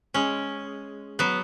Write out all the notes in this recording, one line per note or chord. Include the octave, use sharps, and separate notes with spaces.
G#3 C#4
F#3 B3